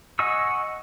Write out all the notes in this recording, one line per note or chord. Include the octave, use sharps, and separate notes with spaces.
D#5 F#5 G#5 C#6 E6